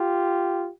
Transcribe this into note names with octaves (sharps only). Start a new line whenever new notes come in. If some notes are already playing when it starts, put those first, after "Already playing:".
Already playing: F4 G4